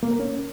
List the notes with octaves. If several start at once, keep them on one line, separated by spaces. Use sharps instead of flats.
A#3
A#4
C#4